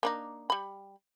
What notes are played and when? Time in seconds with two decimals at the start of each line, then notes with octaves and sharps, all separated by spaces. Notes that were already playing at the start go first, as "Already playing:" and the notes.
0.03 A#3 D4 D#4
0.50 G3 B5